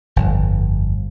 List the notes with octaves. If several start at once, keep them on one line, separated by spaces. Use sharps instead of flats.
G1 F2